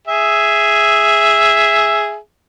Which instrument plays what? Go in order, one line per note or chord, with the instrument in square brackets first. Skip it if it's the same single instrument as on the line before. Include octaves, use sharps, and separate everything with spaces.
[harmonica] G#4 E5